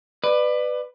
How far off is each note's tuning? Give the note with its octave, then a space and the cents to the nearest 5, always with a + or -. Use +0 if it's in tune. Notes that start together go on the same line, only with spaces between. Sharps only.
B4 +10 D5 +30